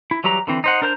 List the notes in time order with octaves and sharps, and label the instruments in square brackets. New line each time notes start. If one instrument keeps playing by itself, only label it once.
[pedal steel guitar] E4
E3 F#3 G3 G4 A#5
D3 E3 C4
D#4 C5 F#5
D4 A#4 C5 A#5 G6